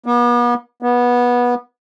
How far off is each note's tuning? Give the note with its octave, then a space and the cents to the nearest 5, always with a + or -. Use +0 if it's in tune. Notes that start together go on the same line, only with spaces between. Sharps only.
B3 -40
B3 -20